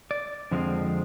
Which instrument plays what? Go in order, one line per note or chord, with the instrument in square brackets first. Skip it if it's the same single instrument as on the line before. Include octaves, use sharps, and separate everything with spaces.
[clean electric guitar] D5
F2 D3 F3 G#3 C4